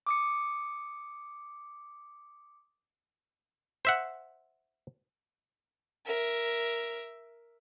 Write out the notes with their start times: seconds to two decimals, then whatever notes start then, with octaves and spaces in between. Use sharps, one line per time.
0.07 D6 D#6 C#7
3.85 C5 E5 F#5
6.06 A#4 E5